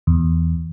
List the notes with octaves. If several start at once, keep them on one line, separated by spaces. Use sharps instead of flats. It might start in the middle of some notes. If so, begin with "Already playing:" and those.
E2